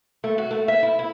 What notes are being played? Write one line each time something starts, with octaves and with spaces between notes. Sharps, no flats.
A3
F#4
A3
E5
E4
E4